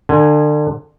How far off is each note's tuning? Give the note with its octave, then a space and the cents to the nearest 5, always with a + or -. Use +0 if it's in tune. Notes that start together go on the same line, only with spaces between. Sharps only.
D3 +30 G#5 +0